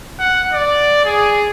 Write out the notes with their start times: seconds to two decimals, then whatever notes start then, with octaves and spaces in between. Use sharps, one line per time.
0.19 F#5
0.53 D5
1.05 G#4